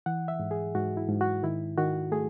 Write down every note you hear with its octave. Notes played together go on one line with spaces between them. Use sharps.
E3 F#5
E5
G#2
G#4
G#2 F#4
E4
G#2
F#4
D#3 E4
D#3 F#4
A3 G#4